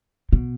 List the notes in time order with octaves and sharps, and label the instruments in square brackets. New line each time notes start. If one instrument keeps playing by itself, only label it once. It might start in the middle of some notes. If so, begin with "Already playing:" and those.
[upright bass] B2